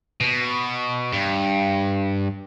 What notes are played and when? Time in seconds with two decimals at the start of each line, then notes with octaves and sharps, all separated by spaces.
0.21 B2
1.13 G2